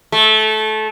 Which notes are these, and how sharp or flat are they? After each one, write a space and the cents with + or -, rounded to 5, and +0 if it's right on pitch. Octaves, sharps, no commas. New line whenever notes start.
A3 -20